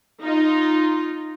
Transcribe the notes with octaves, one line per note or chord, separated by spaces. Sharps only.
D#4 F4